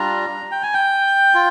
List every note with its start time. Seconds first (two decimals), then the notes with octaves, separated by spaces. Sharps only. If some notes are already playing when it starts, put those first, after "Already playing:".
Already playing: G3 D4 F4 A#5
0.52 G5
0.63 G#5
0.74 G5
1.34 F4